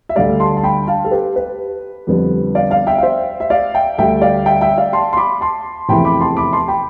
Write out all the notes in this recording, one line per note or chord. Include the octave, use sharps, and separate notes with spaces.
E5
D2 D3 G3 D5 F5
A5 C6
A5
G5 B5
F5 A5
A4
G4 B4
G4 B4
F2 D3 G3 B3
D5 F5
D5 F5
E5 G5
F5
C5 E5
E5
D5 F5
E5 G5
D2 D3 G3 E5 G5
D5 F5
E5 G5
E5 G5
D5 F5
A5 C6
C6
B5 D6
A5 C6
F1 E2 C3 E3 G5 B5
B5 D6
A5 C6
B5 D6
A5 C6
G5 B5